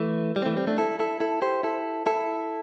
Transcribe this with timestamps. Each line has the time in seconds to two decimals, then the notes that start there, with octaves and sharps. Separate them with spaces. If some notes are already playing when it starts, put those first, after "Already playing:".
Already playing: E3 A3
0.36 G3
0.42 C4
0.46 E3 A3
0.57 G3 C4
0.67 A3 D4
0.78 E4 A4
1.00 E4 A4
1.20 E4 A4
1.42 G4 C5
1.63 E4 A4
2.06 E4 A4